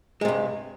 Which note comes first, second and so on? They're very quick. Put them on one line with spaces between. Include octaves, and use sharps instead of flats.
G#3 C3 G2